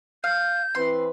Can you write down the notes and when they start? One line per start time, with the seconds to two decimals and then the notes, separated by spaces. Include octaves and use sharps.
0.24 F5 G6
0.75 E3 C4 B4 C6